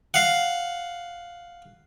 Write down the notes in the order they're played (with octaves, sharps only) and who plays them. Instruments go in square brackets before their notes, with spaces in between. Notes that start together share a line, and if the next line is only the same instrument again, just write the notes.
[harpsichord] F5 F#5